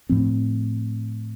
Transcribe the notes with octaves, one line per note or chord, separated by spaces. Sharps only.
A2 F3 C4